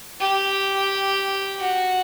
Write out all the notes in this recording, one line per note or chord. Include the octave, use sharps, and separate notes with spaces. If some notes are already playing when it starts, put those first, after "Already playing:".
G4
F#4